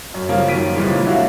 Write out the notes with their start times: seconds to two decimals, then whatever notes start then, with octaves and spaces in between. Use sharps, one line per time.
0.14 F#2
0.29 C#3 F3 G3 A#3 C#4
0.47 F#2 D#3 B6 D7 D#7
0.76 A#2 C#3 E3 F3 G3 G#3
1.06 D4 E4 F#4 C#5 F5